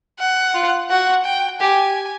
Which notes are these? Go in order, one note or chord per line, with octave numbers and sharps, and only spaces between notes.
F#5
F4
F#4 F#5
G5
G4 G#5